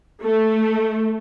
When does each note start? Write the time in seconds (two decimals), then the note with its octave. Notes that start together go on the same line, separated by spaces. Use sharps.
0.22 A3